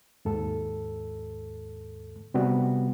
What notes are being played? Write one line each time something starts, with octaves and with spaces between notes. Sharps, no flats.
D#2 G#2 A4
C3 G3 B3 F#4